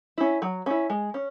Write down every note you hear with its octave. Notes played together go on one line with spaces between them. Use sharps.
C#4 E4
F#3
C#4 E4
G#3
C#4